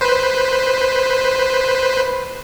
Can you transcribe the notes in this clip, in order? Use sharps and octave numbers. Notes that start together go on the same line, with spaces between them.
B4 C5